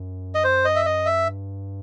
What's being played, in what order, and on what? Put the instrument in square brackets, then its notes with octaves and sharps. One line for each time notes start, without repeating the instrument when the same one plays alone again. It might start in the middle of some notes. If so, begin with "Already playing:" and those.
Already playing: [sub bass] F#2
[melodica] D#5
C5
D#5
E5
D#5
E5
[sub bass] G2